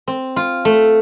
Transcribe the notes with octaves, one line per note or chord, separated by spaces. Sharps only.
C4
F4
A3